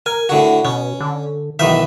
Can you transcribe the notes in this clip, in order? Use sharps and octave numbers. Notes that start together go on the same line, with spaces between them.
A#4 G#5
A2 D3 F#4
B2 C#4
D3
B1 D#3 E3 E5